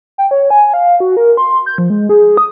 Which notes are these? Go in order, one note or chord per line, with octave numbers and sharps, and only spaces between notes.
G5
C#5
G#5
F5
F#4
A#4
C6
G6
F3
G#3
G#4
D#6